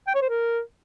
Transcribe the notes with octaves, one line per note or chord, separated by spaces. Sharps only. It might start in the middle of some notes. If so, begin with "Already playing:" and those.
G5
C#5
C5
A#4